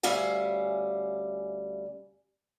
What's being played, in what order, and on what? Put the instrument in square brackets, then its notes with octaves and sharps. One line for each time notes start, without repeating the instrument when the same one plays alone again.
[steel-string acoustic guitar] D2 G3 C#4 E5 F5 G#5